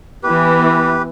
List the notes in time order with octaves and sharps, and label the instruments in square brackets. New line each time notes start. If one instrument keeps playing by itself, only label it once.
[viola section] E3 B3 [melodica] G4 B4